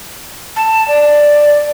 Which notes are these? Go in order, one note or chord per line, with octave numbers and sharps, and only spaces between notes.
A5
D5